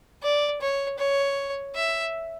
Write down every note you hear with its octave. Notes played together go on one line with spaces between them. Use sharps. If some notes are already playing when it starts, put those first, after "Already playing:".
D5
C#5
C#5
E5